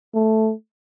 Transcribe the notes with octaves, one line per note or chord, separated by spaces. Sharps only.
A3